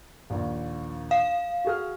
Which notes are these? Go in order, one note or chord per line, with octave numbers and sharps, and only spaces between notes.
A#1 D#2
F5
F#4 G#4 F6